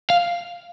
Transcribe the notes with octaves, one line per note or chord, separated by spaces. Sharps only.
F5